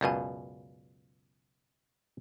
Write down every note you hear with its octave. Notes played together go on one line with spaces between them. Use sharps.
C#2 F#2 B2 D5 F5 G#5